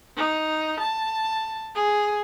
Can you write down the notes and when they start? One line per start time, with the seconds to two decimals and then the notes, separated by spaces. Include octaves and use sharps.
0.17 D#4
0.80 A5
1.75 G#4